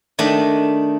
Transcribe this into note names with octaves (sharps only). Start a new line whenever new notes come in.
D#3 A3 D4 D#5